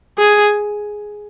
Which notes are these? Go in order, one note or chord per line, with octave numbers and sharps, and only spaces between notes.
G#4